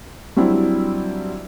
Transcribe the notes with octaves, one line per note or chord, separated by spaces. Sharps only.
F#3 G3 C4 D4 E4